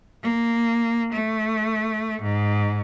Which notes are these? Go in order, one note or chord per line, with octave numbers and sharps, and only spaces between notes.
A#3
A3
G#2